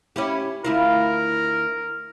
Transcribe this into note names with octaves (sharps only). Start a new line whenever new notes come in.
C#4 E4 G4
D2 E4 F4 A#4